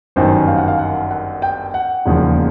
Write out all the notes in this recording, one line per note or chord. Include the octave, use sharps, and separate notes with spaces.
G1 F#2 D#3 C5
F5
F#5
F5
F#5
F#5
G5
F#5
E1 D#2 C#3 F3